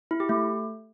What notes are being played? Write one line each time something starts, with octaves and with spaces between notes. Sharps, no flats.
E4
G4
A3